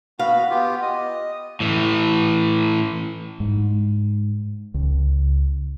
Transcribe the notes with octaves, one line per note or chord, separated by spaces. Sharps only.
B3 F#4 F5 B5
B3 F4 G4
D#5
A2 E3
G#2
C#2